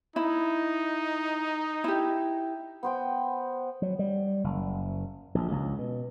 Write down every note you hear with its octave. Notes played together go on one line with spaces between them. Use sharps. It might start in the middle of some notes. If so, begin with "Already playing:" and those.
D#4 E4
E4 G4
B3 C5 G5
F#3
G3
F#1
A#1
C#2
B2